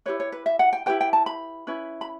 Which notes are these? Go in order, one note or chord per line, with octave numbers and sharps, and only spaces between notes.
E4 G4 B4 C#5
C#5
B4
E5
F#5
G5
E4 G4 B4 G5
G5
A5
B5
C#4 E4 B4
B5